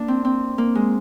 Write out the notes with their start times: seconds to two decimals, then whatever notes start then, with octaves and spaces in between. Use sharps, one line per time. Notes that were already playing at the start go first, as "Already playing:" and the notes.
Already playing: A#3 D4
0.08 C4
0.25 C4
0.58 A#3
0.75 G#3